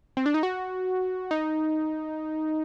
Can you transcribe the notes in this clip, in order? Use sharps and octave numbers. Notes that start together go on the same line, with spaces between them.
C4
D4
D#4
F#4
D#4